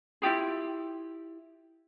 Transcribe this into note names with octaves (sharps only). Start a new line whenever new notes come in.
E4 F4 G4 G#4